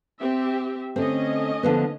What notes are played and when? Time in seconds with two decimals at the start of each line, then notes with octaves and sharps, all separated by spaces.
0.20 C4 G4 E5
0.96 D3 A3 C4 C#4 D#5
1.63 D3 F3 B3